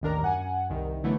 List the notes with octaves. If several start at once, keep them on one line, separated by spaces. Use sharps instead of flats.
A1 D#2 D#3 D4 A#4 A#5
F#2 F#5 G#5
C2 D#3
D3 E3 F#3 A3 B3 E4